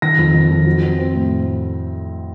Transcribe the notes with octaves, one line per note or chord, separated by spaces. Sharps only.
D#3 A#6
F2
D#3
F2
F#3
C4
C4
A2